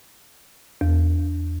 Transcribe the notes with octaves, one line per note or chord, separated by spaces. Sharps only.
E2